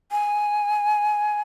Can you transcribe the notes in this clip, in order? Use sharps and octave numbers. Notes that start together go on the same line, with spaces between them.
G#5